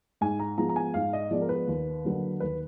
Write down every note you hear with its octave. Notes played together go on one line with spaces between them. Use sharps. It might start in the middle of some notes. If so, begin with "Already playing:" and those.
G#2 G#5
A#5
F3 G#3 B3 A#5
A#5
G#5
G#2 F5
D#5
F3 G#3 B3 D5
A#4
B4
D#2
D3 F#3 A#3
D#2 B4